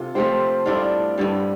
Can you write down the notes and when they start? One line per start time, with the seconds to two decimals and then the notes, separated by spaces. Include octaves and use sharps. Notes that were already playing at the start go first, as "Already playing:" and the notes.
Already playing: C3 F4 A4
0.15 F3 A3 C4 G4 C5
0.66 A2 G3 D4 F4 A4 D5
1.18 G2 D3 G3